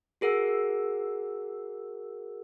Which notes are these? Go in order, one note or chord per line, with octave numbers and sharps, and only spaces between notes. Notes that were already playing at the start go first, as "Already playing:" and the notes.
F#4 G#4 A#4 F#5 E6